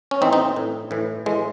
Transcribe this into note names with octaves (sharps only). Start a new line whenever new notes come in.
C#4
A2 E3 C4 D#4
C4 D#4
A2 E3
A2 E3
A2 E3 G#3